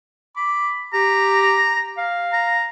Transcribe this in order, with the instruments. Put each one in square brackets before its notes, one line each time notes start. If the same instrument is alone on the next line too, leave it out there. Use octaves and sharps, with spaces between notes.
[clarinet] B5 [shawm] D6
[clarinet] G4 [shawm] A#5
[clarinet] F5
[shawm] A#5